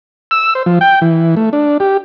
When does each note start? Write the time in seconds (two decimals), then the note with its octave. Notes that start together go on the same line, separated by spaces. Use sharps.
0.31 E6
0.55 C5
0.66 F3
0.81 G5
1.02 E3
1.37 A3
1.53 D4
1.80 G4